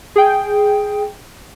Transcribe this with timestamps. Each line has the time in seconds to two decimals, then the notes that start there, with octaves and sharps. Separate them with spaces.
0.16 G#4 G5